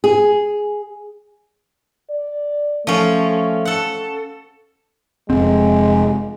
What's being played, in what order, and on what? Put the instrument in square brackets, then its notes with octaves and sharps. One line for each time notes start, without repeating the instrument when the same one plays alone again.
[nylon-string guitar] G#4
[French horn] D5
[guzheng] F3 C#4 [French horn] A3
[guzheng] A4 F#5
[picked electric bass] F1 C4 [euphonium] G#3